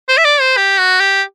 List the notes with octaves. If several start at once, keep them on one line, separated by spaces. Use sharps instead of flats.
C5
E5
D5
C5
G4
F#4
G4